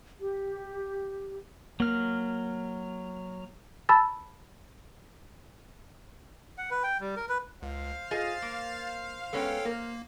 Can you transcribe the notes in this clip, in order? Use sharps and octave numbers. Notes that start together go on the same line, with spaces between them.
G4
F#3 A#3 F6
A5 B5 E6 A6
F#5
B4
G5
G3
A#4
B4
C#2 C5 F5
F4 G#4 D#5 A6
A#3
G#3 B3 C#4 A4 C#5 G5
A#3 A#4